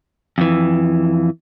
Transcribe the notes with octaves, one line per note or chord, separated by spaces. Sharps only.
F2 E3